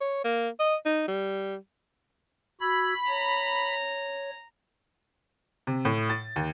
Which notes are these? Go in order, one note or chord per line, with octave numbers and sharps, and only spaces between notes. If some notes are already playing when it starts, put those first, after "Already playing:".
C#5
A#3
D#5
D#4
G3
F#4 B5 E6 G#6
C#5 A#5
C3
A2
A6
D#2